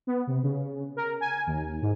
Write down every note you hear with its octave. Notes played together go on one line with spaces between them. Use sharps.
B3
C3
C#3
A#4
G#5
D#2
G#2